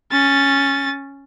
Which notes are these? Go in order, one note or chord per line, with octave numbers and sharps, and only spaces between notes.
C#4 A6